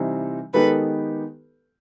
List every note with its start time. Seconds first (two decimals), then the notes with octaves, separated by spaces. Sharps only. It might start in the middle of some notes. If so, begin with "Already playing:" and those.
Already playing: C3 E3 G3 C4 D#4
0.53 D#3 G#3 B3 D#4 G4 A4 B4